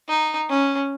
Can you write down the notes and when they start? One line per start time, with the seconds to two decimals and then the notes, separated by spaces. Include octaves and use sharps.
0.08 D#4
0.49 C#4